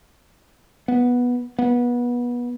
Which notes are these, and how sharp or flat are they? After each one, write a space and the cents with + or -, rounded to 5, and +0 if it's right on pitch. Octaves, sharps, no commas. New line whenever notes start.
B3 -10
B3 -25